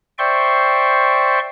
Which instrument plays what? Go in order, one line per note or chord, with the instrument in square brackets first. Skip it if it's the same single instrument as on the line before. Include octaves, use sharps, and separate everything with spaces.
[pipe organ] C5 D5 E5 G5 C6 C#6